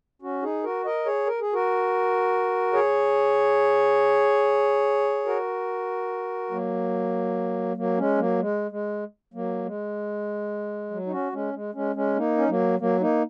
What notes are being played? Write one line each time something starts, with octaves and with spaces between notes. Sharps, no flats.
C#4 F#4
D#4 G#4
F#4 A#4
A#4 D#5
G#4 C#5
A#4
G#4
F#4 A#4
G#4 C#5
F#4 A#4
F#3 A#3
F#3 A#3
G#3 C#4
F#3 A#3
G#3
G#3
F#3 A#3
G#3
F#3
D#4
C#4 F#4
G#3 C#4
G#3
G#3 C#4
G#3 C#4
A#3 D#4
C#4
F#3 A#3
F#3 A#3
A#3 D#4